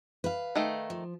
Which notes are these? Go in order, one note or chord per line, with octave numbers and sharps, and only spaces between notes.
B4 F5
D#3 A3
F3